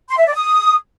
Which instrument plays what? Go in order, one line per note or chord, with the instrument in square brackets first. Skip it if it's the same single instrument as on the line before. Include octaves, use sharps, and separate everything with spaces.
[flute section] C6
E5
D5
D#6